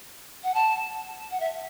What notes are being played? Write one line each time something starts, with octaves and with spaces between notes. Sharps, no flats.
F#5
A5
F#5
E5